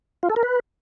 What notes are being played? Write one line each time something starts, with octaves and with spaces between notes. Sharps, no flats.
F4
A4
A#4
B4